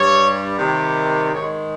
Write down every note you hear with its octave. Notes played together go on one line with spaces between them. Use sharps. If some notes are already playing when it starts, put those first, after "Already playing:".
Already playing: G2 G3 C#5
C3 D#3 G3
G#2 D#3 G#3 C#5